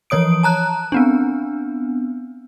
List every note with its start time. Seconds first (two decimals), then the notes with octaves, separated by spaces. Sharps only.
0.10 E3 F3 C#5 D#6 D7
0.43 A5 A#5 F#6
0.92 B3 C4 D4